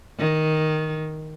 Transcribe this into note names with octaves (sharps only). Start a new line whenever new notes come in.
D#3